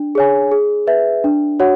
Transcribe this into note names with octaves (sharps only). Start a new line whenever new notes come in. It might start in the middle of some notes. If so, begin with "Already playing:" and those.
Already playing: D4
G#4 C#5 G#5
G#4
B4 E5
D4
F#4 C#5 F#5